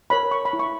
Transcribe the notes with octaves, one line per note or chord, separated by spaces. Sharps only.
A#4 C#5 B5
C#6
B5
E4
C#6